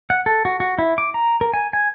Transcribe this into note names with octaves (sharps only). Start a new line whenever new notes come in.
F#5
A4
F#4
F#4
E4
D6
A#5
A#4
G#5
G#5